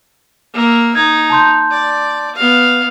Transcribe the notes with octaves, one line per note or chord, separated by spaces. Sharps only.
A#3 E5
D#4 G#6
A5 C6 G6
D5
B3 F5